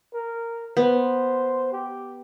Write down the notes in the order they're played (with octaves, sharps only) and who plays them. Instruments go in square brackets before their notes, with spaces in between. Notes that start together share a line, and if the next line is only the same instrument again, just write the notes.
[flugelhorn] A#4
[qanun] B3 [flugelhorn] C5
[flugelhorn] G4